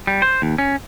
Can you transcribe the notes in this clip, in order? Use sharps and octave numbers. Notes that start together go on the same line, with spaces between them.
G3
C5
D#2
C#4